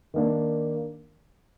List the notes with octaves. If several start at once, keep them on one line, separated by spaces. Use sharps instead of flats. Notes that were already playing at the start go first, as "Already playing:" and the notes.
D#3 A#3 D4